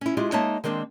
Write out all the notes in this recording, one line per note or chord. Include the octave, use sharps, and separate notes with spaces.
C#4 E4
G#3 E4 F4 G4
G#3 A#3 D#4 C#5 E5 A5
D#3 G#3 A#3 C4 D4